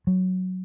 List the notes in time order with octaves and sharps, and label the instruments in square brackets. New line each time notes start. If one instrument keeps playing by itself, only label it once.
[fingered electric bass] F#3